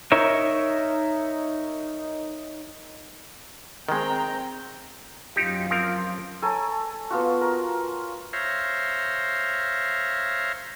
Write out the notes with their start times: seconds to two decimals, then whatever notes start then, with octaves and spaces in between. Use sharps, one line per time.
0.12 D#4 A#4 C#5 E5
3.89 D#3 G#3 C4 G5 A#5
5.36 F#2 D#4 F4 G4
5.71 F3 C4 A#4
6.42 A4 C#5 G#5 A#5
7.10 B3 F4 F#4
7.41 A#4
8.33 C5 C#5 E5 F5 A#5